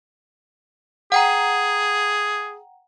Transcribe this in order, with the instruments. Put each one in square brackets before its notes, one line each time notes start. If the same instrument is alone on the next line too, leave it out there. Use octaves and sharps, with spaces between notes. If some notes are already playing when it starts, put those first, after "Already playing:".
[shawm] G#4 [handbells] F#5 G5 A#5